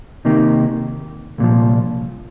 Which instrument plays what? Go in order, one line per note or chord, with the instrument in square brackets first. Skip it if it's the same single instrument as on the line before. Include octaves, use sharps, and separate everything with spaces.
[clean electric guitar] C3 D#3 A#3 D#4 G4
C2 A#2 F3